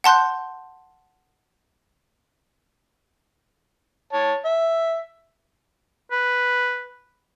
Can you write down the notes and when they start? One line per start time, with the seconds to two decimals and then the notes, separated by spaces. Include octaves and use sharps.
0.04 F#5 A5 C6 F#6 G6
4.13 C#5 A5
4.45 E5
6.12 B4